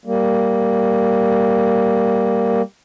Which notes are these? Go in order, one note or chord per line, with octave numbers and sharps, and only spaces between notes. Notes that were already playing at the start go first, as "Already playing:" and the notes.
G3 A#3